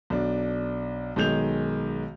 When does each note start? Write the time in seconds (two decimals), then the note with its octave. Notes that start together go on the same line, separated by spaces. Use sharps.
0.10 B1 D4
1.16 B1 D#3 G#3 G6 F7